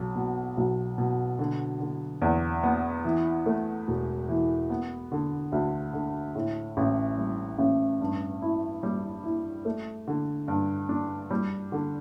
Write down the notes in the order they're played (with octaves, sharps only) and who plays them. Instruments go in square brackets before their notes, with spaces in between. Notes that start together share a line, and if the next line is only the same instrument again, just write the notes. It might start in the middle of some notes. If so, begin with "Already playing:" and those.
Already playing: [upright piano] B1
B2
B1
B2
D3
D3
E2
B3
E3
A3
E1
E3
B3
D3
D2
D3
A2
A1
G3
A1
G2
E4
G3
E4
A3
D3
G2
D4
G3
D3